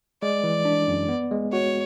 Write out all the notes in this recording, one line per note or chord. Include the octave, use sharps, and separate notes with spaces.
G#3 D5
E3
D4
F#2
B3
G#3
F#4 C#5